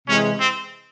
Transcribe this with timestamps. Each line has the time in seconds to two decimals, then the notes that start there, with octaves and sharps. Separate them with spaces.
0.08 C3 E3 G#3 C#4
0.40 C4